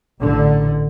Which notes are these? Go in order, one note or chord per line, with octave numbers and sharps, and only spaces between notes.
A1 D3